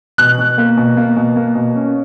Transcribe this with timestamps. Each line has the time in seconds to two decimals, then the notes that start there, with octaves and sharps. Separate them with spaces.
0.18 B2 F#6
0.39 B2
0.58 A#3
0.77 B2
0.97 A#3
1.16 B2
1.36 A#3
1.55 B2
1.75 C#4